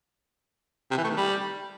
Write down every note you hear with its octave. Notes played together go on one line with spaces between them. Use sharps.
C3
E3
A3
D#3
G3